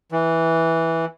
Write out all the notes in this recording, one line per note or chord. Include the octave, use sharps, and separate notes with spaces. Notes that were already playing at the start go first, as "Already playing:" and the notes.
E3